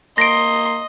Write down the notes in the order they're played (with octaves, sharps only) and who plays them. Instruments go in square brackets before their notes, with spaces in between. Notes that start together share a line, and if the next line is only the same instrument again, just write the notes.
[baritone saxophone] A#3 [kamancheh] D#5 [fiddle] C6 [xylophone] A#6 D7